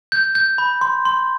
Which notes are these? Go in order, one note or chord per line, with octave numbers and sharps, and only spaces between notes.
G6
G6
B5
C6
C6